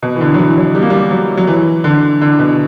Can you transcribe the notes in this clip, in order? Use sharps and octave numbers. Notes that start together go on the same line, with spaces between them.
B2
E3
D3
F#3
E3
F#3
G3
A#3
G3
F#3
F#3
E3
D3
D3
B2